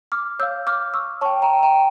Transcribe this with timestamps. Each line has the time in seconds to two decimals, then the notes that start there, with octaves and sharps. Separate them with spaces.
0.12 D6 F6
0.39 C#5 F5 E6 G6
0.67 D6 F6
0.94 C#6 E6
1.21 C#5 G5 A5 C#6
1.42 G5 A#5
1.63 G5 A#5